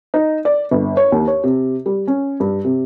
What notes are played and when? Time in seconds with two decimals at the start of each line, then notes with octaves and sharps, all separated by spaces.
0.14 D#4
0.45 D5
0.71 G1
0.97 C#5
1.12 D#2
1.28 C#5
1.44 C3
1.86 G3
2.07 C#4
2.40 G2
2.65 C3